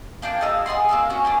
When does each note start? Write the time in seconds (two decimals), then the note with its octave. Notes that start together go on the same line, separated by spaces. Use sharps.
0.22 A#3 D4 F4 G5
0.41 A4 D#5 F5 E6
0.66 G#4 D#5 F#5 C6
0.89 A#3 F4 F5 E6
1.10 C#4 F#4
1.25 A#3 C#4 D4